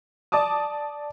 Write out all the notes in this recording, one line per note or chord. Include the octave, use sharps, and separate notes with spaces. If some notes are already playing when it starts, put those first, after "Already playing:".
D5 A5 D6 D#6